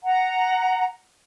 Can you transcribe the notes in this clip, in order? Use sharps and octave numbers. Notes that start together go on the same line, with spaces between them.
F#5 A#5